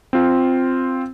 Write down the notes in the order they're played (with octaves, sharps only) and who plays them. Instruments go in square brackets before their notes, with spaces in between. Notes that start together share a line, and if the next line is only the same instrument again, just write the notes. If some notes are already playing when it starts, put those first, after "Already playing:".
[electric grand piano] C4 F4